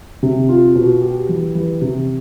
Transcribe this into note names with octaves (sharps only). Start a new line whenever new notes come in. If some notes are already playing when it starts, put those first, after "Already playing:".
C3
F4
B2
G4
E3
E3
C3